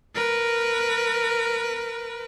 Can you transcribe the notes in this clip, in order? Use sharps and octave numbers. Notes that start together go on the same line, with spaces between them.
A#4 B4